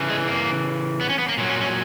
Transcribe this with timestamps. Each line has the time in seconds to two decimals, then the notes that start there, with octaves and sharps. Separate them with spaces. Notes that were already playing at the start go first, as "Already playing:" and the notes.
Already playing: C#3 E3
0.10 G#3
0.28 A#3
1.01 B3
1.09 C#4
1.19 B3
1.29 A#3
1.37 A#2 F#3
1.49 C#4
1.61 C#4